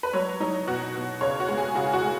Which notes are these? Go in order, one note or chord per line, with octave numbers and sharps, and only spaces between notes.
B4
F#3 C#5
F#3 D#4
B2 F#4
B2
C#3 C#5
F#4
G#3
G#4
C#3 F#4
F#4
G#3